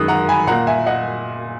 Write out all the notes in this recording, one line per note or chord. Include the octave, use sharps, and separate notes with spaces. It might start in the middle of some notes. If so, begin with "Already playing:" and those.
Already playing: F#2 D#3 G#3 D#6 F#6
F#5 A#5
G#5 B5
A#2 A#3 F#5 A#5
E5 G#5
D#5 F#5